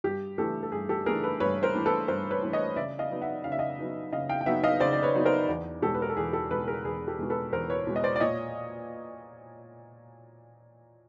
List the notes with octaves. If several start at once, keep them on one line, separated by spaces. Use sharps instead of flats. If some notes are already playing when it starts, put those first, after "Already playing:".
G2 G4
E3 A3 D4 G4 A4
A4
G2 G#4
G4 A4
E3 A3 D4 G#4 A#4
A4 B4
G2 B4 C#5
A#4 C5
E3 A3 D4
A4 B4
G2 A#4 C5
B4 C#5
E3 A3 D4
C#5 D#5
C#3 D5 E5
D#5 F5
F#3 B3 D#4
E5 F#5
C#3 F5
E5
D#5 F5
F#3 B3 D#4
C#3 D#5 F5
F5 G5
G5
F#3 B3 D#4 E5 F#5
D#5 F5
C#3 C5 D5
D5
B4 C#5
F#3 B3 D#4
A#4 C5
E2
B2 G#3 G4 A4
B4
A#4
A4
E2 G#4
G4 A4
B2 G#3 A4 B4
G#4 A#4
E2 G#4
G4 A4
B2 G#3
A4 B4
E2 A#4 C5
B4 C#5
B2 G#3
D#5
C5 D5
D5
A#2 C#5 D#5